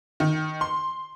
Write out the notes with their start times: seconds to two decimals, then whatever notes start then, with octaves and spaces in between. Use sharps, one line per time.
0.20 D#3
0.61 C6